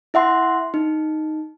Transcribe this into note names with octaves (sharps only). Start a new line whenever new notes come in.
E4 E5 F#5 C6
D#4